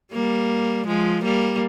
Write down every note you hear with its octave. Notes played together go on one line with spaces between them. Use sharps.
G3 A#3
F3 G#3
G3 A#3